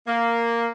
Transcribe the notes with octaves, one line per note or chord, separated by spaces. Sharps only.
A#3